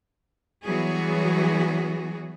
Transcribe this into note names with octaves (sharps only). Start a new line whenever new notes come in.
E3 F#3 G3 B3 F#4 G#4